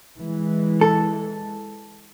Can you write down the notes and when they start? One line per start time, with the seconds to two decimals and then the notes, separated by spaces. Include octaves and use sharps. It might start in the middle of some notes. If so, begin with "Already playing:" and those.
0.18 E3 G#3
0.81 A4